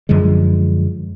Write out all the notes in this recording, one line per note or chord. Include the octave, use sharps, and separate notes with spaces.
F#2 D3 F3 G#3